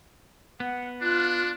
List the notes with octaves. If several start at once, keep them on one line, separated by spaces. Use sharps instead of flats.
B3 F#5
D4 F4 F#6